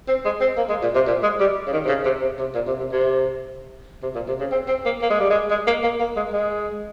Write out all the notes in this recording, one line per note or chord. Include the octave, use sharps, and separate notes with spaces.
C4
G#3
C4
A#3
G#3
A#2
C3
A#2
G#3
G3
C#3
D#3
C3
C#3
C3
C3
C3
A#2
C3
C3
C3
C3
A#2
C3
C#3
C4
C4
A#3
A#3
G#3
G3
G#3
G#3
A#3
A#3
A#3
G#3
G#3